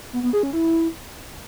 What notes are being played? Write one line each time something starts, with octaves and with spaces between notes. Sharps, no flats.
B3
B3
G#4
C#4
E4